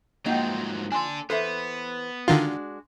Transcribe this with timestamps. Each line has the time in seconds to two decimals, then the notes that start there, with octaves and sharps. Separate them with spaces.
0.26 G#2 F3 F#3 A#3 D#4 F4 F#5 G5
0.92 D4 A4 G#5 C6
1.30 E3 B3 A4 B4 C5 E5
2.28 D3 D#3 G#3 D4 F4 F#4